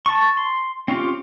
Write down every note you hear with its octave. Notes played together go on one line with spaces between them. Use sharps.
A5 C#6
C6
C4 C#4 F4 G4